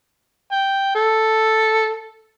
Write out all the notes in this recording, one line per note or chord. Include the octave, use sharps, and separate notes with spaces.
G5
A4